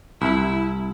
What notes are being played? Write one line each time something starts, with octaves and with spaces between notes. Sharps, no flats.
C2 E4